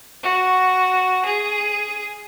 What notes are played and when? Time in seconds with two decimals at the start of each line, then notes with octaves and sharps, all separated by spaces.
0.23 F#4
1.25 G#4